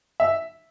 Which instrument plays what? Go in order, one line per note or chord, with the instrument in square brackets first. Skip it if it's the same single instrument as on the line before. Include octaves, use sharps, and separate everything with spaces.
[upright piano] E5